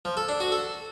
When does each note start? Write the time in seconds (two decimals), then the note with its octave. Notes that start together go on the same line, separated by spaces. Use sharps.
0.05 F3
0.17 A4
0.29 D4
0.40 F#4
0.52 A4